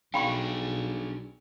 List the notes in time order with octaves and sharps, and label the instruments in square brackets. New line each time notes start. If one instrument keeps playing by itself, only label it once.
[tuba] B1 [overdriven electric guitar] D4 G#4 [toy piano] G5 B5 C#6